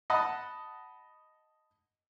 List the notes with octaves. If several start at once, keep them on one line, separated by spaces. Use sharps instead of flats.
D#5 F#5 A5 B5 D#6